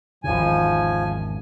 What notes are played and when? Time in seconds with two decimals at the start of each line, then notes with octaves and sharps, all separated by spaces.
0.24 G#1 E2 C#3 F3 G#5